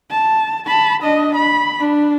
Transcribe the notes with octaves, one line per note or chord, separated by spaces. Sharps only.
A5
A5 B5
D4 D#5
B5
D4